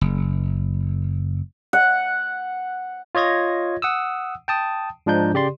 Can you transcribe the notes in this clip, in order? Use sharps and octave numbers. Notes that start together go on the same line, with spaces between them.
F#1
F#5
F4 C#5 D#5 G#6 A#6
F#5 D#6 E6
G5 A5 D#6
G#2 F3 D4 D#4 G6
C#3 G4 D5 C6